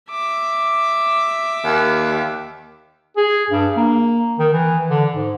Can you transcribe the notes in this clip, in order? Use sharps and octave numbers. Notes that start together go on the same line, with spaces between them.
E5 D6
D#2
G#4
G2
A#3
D#3
E3
D3
G#2